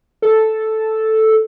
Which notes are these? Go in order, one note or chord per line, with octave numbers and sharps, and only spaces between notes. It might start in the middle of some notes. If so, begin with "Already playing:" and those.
A4